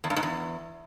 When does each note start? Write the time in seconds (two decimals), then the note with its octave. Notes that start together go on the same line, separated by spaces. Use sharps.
0.04 E2
0.10 G2
0.16 G#2
0.23 E2